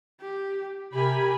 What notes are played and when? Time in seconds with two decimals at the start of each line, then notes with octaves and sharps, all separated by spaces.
0.21 G4
0.94 C3 G4 A#4 G#5 B5